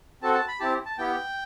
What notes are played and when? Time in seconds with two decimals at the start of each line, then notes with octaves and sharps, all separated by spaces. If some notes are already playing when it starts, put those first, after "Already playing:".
0.22 C4 F#4 A4 A5
0.34 A5
0.48 B5
0.60 C4 E4 G4 A5
0.86 A5
0.98 B3 E4 G4 G5